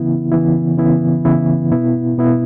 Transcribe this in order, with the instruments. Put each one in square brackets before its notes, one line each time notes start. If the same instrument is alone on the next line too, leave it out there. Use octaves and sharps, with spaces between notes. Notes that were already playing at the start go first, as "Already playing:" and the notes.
Already playing: [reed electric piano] C#3 E3 B3 E4
C#3 E3 B3 E4
C#3 E3 B3 E4
C#3 E3 B3 E4
B2 B3 E4
B2 B3 E4